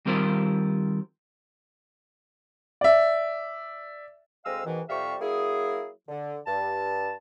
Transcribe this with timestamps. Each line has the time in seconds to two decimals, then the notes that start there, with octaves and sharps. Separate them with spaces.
0.06 D#3 G3 C4 F4 A#4 C5
2.81 D5 E5
4.45 D2 G#3 C4 D#5 F5 E6
4.66 G#2 B2 D#3 E3
4.89 F2 C3 G3 E5 F5 C#6
5.21 F#3 A#3 E4 G#4
6.09 D3
6.47 G2 A5